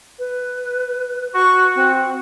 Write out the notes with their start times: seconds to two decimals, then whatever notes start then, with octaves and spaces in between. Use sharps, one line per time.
0.19 B4
1.34 F#4 C#6
1.75 C4